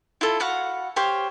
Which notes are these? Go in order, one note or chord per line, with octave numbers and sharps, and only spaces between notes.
E4 F4 A4
F#4 F5 F#5 B5
G4 C5 C#5 F5